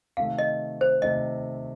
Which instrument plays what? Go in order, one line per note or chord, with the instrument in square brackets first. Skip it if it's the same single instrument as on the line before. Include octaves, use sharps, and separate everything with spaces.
[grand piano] C3 D#3 A3 [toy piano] F5
[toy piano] D#5
C5
[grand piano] C3 D#3 A3 [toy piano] D#5